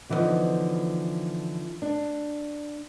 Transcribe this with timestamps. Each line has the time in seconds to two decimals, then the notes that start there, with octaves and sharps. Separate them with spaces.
0.09 D3 E3 F3 G3 B3 D#4
1.82 D4